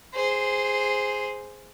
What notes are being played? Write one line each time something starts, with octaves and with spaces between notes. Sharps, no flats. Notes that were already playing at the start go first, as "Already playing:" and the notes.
G#4 C5